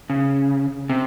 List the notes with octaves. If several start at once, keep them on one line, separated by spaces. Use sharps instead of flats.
C#3
C3